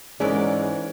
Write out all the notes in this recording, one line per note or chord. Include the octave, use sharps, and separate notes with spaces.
G#2 E3 G#3 C#4 A#4 D5